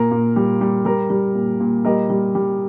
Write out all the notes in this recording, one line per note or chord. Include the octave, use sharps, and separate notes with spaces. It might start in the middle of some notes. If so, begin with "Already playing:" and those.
Already playing: A#2 A#4
A#2
G3
G3
G3 A#4
G3
A#2
A#2
G3 A#4 D#5
G3
G3